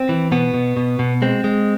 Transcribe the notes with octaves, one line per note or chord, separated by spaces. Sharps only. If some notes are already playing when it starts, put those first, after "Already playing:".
Already playing: C4
E3
B2 B3
B2
B2
B2
G#3 C4
G#3